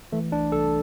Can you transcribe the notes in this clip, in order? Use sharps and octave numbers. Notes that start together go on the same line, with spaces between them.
E3 A3
C2 D4
C2 A4